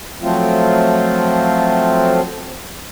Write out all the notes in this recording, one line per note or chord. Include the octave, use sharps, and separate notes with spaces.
F3 F#3 A3 C4 F4